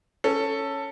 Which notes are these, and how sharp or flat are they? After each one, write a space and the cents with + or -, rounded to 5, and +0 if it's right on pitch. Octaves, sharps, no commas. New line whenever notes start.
C#4 +0 A4 +15